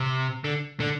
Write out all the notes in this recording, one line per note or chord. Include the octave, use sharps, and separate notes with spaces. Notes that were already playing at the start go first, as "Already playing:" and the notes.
Already playing: C3
D3
D3